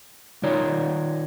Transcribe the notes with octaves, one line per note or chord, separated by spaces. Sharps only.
D#3 D#4 F4 A#4 C#5 D5